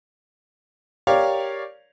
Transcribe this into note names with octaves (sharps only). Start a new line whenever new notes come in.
G4 A#4 C#5 D5 F5